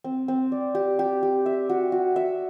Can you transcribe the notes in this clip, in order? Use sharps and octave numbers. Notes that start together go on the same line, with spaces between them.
C4
C4
D5
G4
G4
G4
E5
F#4
F#4
E5